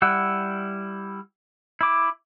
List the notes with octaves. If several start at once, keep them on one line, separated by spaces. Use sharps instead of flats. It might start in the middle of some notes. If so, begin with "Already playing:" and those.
G3 E4 F#5 E6
E4 D6